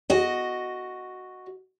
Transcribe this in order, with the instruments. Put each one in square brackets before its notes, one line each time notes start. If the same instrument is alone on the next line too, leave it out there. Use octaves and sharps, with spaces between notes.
[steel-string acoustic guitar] F#4 D#5